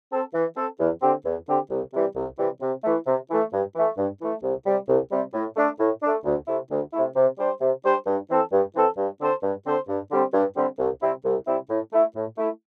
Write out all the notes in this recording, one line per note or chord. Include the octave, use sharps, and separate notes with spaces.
C4 A4
E3
C4 A4
E2
D3 C4 G4
E2
D3 C4 G4
C2
C3 E3 G3
C2
C3 E3 G3
C3
E3 A3
C3
E3 A3
G2
E3 A3
G2
E3 A3
C2
C3 G3
C2
C3 G3
A2
A3 D4
A2
A3 D4
D2
C3 A3 E4
D2
C3 A3 E4
C3
G3 D4 G4 C5
C3
G3 D4 G4 C5
G2
E3 C4 A4
G2
E3 C4 A4
G2
D3 C4 A4 C5
G2
D3 C4 A4 C5
G2
D3 G3 C4
G2
D3 G3 C4
C2
C3 G3 C4 E4
C2
C3 G3 C4 E4
A2
A3 E4
A2
A3 E4